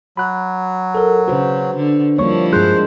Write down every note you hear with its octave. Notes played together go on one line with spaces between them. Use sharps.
F#3 B5 F#6
A4 A#4
C#3 F#4 B4 C5
D3
F3 G3 A#3 D4 E4 C#5 C#6
G2 G#3 G#4 C5 F#6